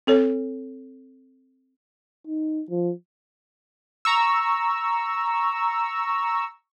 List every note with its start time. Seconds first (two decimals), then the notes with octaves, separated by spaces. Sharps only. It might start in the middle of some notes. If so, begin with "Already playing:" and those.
0.07 C4 A4 C#5
2.27 D#4
2.70 F3
4.05 A#5 C#6 E6